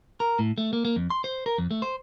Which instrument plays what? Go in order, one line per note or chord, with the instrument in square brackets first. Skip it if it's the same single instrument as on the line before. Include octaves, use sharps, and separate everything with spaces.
[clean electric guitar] A#4
A2
A3
A#3
A#3
F2
C6
C5
A#4
F2
A3
C5